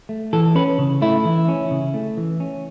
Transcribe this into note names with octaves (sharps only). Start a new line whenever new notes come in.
A3
E3 A4
C#4 B4
C#3
A3 E4
E3
C#4
C#3
A3
E3
C#4